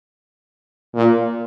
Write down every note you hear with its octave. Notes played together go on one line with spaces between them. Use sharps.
A#2